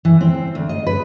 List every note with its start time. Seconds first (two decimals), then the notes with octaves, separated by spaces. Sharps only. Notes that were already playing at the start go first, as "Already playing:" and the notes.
0.05 E3
0.21 C4
0.55 D2
0.69 D#5
0.87 B4